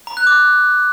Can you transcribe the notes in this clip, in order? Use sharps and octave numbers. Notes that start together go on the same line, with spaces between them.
A#5
F#6
D6